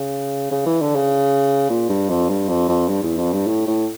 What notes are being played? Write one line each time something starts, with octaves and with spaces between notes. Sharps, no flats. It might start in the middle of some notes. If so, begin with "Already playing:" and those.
Already playing: C#3
C#3
E3
D3
C#3
A#2
G2
F2
G2
F2
F2
G2
E2
F2
G2
A2
A2